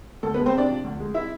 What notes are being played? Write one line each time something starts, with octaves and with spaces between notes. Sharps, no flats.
D2 A4
B3 B4
G#3
C4 C5
C3 D4 D5
F3
D2
G#3
E4 E5